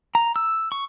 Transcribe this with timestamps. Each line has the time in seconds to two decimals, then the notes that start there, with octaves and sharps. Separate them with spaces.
0.15 A#5
0.36 E6
0.72 C#6